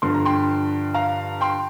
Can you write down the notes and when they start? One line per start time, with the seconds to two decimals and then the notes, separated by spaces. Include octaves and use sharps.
0.02 G2 D3 F3 C6
0.14 A#5
0.25 G5 C6
0.94 F5 A#5
1.41 G5 C6